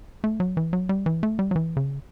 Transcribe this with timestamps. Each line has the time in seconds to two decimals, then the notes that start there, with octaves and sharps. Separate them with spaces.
0.24 A3
0.40 F#3
0.57 E3
0.73 F#3
0.89 G3
1.06 E3
1.23 A3
1.39 G3
1.51 F#3
1.56 E3
1.77 C#3